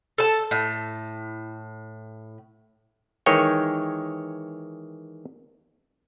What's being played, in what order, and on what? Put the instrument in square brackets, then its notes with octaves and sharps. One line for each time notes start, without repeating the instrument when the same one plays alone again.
[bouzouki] A4 A5
A2
[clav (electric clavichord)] D#3 E3 G#3 C#5 G5